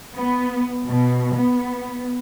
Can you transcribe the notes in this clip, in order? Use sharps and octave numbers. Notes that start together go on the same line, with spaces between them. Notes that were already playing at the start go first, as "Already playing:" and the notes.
B3
B2
B3